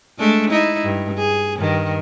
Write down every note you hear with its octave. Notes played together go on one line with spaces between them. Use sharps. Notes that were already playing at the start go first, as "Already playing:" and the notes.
G#3 A3 D4
D#4 E4
G2
G#4
G2 D#3